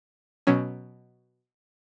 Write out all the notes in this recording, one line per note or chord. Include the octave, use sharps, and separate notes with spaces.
B2 F#3 C#4